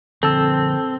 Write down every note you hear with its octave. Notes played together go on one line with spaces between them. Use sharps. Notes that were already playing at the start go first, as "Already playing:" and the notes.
D3 F3 C4 A4 A5 E6